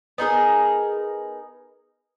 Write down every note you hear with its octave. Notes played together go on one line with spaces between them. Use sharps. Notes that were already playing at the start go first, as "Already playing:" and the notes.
B3 D#4 G#4 A#4